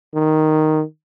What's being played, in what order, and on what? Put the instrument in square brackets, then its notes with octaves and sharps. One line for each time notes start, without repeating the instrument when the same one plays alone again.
[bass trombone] D#3